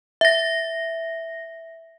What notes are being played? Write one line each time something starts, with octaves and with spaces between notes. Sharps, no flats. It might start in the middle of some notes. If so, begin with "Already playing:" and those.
E5 A#6